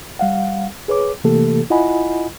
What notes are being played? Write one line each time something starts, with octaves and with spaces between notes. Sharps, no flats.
G3 F5 F#5
G#4 B4 C#5 D6
C3 E3 A3 A#3 G4 A4
E4 F4 D#5 F#5 G#5 B5